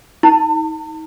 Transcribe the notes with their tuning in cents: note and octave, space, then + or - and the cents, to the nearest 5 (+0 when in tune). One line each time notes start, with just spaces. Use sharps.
D#4 +30 A5 +40